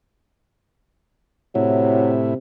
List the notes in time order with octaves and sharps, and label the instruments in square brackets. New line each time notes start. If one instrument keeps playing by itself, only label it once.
[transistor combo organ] A2 E4 [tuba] C3 [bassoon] F#3